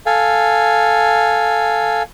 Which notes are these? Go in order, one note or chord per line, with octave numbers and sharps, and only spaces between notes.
A4 F5 G#5